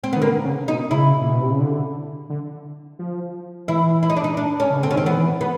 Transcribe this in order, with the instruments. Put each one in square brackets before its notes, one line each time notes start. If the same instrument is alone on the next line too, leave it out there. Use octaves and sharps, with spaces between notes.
[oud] C4
[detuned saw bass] D#3 [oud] B3
[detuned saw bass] D3 [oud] A#3
[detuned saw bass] C#3
[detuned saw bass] B2 [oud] D#4
[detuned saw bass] C#3 [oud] E4
[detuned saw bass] A#2
B2
C3
C#3
D3
D3
F3
[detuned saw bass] E3 [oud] E4
[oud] E4
D#4
D4
D#4
D4
C#4
[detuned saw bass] C#3
[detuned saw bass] D3 [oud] C4
[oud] C#4
[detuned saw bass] D#3 [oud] C4
[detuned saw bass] E3 [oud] B3
[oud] B3